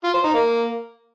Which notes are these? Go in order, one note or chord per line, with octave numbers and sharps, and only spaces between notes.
F4
C5
D#4
A#3